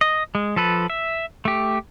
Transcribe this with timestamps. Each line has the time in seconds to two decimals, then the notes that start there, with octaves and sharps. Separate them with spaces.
0.01 D#5
0.35 G#3
0.56 F3 A4 B4
0.90 E5
1.45 A3 G4